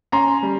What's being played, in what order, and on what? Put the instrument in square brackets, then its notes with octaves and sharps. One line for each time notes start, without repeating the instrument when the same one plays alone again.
[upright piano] C#4 A#5 C6
G3